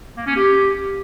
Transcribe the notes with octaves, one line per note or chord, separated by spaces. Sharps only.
A#3
C#4
G4